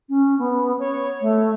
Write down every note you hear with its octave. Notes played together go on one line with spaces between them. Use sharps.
C#4
B3
C#5
A3